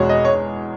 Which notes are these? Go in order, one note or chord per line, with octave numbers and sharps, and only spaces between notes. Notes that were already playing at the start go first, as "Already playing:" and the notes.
Already playing: E1 E2 G#3 F#4 C#5
D#5
C#5